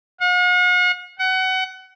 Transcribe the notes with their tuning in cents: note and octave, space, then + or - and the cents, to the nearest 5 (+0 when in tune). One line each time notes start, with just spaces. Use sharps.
F#5 -45
F#5 +25